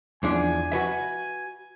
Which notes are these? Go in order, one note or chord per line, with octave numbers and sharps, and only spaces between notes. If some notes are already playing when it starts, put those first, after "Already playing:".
E2 F3 D4 G#5
F#4 B4 E5